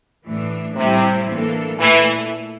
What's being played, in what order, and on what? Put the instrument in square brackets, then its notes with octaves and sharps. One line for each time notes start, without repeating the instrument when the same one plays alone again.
[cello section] A2 E3 A3 D4
[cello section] A2 G3 C4 E4 [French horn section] C3
[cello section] E3 A#3 D4 A4
[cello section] A#2 A3 E4 A4 [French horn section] E3